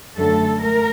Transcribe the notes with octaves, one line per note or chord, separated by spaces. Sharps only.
F#2 D3 F#3 A3 A4
A3 A#4